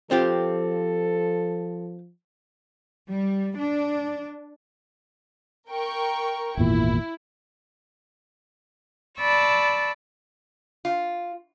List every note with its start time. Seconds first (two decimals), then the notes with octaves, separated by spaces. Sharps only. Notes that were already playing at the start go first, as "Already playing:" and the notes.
0.11 F3 C4 F4 G4 A4
3.09 G3
3.58 D4
5.69 A#4 G5 C#6
6.57 G#1 E2 A#2 E4
9.20 D5 A5 B5 C#6 E6
10.85 F4